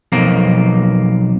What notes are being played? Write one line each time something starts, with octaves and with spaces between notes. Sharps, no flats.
B1 F2 A#3